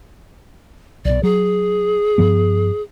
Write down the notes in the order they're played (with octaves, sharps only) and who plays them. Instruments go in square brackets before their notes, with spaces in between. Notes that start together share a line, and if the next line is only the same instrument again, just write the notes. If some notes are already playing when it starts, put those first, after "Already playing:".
[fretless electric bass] B1 B2 [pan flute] D5
[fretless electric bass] F#3 [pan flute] G#4
[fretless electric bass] G2 F3 B3